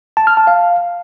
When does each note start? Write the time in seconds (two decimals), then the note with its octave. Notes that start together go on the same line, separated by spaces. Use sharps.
0.17 A5
0.27 F6
0.37 A5
0.47 F5